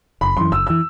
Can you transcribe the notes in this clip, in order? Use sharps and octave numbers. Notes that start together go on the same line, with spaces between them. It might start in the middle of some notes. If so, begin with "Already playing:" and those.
F#1 B5
F#2 E3 C6
F#1 E6
E3 E6